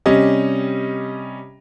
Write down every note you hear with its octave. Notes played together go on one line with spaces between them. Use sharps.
C3 G3 C#4 D#5